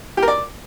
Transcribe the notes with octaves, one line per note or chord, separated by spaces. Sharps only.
G4
A#4
D5